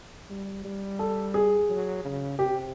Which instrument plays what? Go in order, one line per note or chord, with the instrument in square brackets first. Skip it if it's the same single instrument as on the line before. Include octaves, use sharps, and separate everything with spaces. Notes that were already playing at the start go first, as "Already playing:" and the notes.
[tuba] G3
G3
[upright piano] A4
G#4
[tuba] F#3
C#3
[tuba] C3 [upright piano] G4